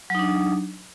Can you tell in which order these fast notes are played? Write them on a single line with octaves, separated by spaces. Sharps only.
F#3 D#4 D4